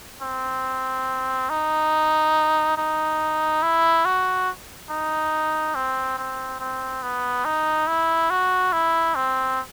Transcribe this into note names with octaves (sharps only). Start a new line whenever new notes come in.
C4
D#4
D#4
E4
F#4
D#4
C4
C4
C4
B3
D#4
E4
F#4
E4
C4